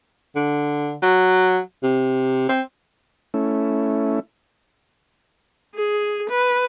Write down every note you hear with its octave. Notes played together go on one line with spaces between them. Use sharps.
D3
F#3
C3
C4
A3 C#4 E4
G#4
B4